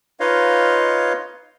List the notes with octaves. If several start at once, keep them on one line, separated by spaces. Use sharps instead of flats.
D#4 F4 B4 C#5 D#5 F5